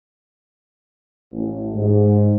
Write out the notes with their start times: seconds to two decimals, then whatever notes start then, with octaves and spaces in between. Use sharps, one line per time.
1.32 A1
1.75 G#2